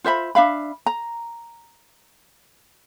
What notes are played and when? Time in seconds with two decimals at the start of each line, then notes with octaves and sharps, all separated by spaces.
0.04 F4 C5 E5 B5
0.35 D4 E5 F5 B5
0.86 A#5